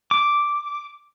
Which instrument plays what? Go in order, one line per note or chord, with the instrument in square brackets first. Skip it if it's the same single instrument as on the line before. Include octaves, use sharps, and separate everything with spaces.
[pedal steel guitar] D6